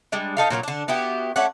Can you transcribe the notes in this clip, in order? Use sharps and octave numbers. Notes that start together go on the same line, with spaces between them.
G3 G#3 D4
D#4 A4 F5
A#2 F#3 F#4 A#4
D3 D4
B3 E4 F#4 G4
A3 C#4 D5 F#5